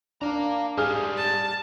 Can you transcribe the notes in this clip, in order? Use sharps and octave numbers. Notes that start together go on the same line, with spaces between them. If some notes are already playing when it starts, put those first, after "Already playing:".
D4 F5 A#5
G#2 G3 G#4 F6
A5